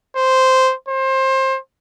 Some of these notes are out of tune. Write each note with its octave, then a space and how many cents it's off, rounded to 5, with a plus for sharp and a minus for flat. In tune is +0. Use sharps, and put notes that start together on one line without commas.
C5 -5
C5 +25